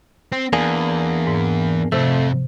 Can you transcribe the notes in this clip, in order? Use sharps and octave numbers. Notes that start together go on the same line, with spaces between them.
C4
E2 A#3 D4 G#4
G#2
F2 C3 A3 E6